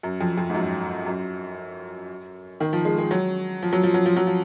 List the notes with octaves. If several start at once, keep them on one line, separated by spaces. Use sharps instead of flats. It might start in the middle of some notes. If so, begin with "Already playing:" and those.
F#2
F2
F2
G#2
F#2
F#2
D#3
F3
G#3
G#3
F#3
F3
F#3
F3
F#3
F3
F#3
F3